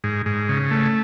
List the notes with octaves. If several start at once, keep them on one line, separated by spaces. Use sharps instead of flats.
G#2
G#2
C#3
A3